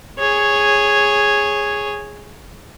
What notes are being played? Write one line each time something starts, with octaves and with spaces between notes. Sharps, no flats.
G#4 C#5